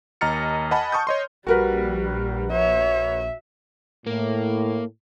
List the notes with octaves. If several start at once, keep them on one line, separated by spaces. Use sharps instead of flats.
D#2 D#5 A#5 F6 A6 C#7
D#5 F#5 G#5 A5 B5
A5 C#6 D#6 G6
C#5 D#5 C6
A#1 G3 F#4 A#4 B4
C#5 E5
A2 A#3